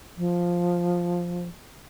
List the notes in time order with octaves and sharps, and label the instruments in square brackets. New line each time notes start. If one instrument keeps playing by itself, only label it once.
[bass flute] F3